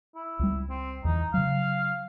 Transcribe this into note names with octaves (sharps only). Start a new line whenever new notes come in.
E4
C#2 G3
C4
E2 E3 D#4
C#3 F#3 F5